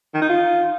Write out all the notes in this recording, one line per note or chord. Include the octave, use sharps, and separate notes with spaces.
D#3
D#4
F4